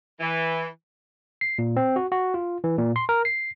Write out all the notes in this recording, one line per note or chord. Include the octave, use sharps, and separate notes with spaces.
E3
C7
A#2
C4
F#4
F#4
F4
E3
A#2
C6
A#4
C7